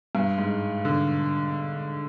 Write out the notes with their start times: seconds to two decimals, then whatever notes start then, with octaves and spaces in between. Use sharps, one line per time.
0.15 G2
0.38 G#2
0.85 D3